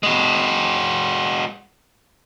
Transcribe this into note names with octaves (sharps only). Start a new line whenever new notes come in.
G#3 F#4